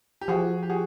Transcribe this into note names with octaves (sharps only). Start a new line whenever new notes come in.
G4
F3 F#4 G#4
G4
F#4 G#4